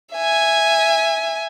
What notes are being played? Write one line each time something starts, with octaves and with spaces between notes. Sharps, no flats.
E5 G#5